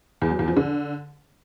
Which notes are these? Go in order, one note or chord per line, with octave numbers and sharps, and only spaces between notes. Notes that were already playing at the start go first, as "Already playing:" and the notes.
E2
F#3
E2
F3
D3